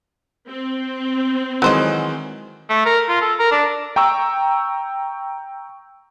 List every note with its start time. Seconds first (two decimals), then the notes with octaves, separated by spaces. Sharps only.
0.48 C4
1.62 D#3 E3 F#3 G#3 C5 D#5
2.70 A3
2.85 A#4
3.09 F4
3.21 A4
3.39 A#4
3.52 D4
3.96 G5 A#5 C#6 E6